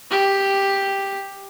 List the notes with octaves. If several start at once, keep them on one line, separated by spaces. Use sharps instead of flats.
G4